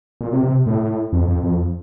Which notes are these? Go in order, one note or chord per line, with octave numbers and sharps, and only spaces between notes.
A#2
C3
C3
A2
F2
F2
F2